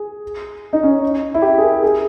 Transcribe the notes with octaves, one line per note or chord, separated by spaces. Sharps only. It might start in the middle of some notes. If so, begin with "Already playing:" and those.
Already playing: G#4
D#4
C#4
E4
G4
G#4
A#4
G#4